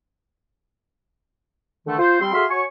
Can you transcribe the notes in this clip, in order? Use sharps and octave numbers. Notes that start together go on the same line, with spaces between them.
D3 D#3 A3
F4 C5
G3 C4 C6
F#4 G#4 A4 E5 F5 C6
F#4 C#5 G#5 C#6